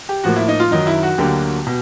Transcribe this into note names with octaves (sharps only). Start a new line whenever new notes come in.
G4
A2 F3 A#3 F#4
E4
D#4
F4
F#2 D#3 F#3 D#4
E4
F#4
D2 D3 F#3 A#3 G4
B2